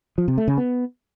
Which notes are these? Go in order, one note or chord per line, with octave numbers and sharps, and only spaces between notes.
F3
C3
A3
C#3
B3